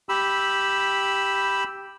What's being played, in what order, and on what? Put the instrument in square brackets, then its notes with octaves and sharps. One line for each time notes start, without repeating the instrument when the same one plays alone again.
[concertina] G4 B5 E6